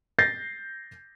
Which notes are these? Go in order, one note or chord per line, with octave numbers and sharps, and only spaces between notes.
G6 A6 A#6 C7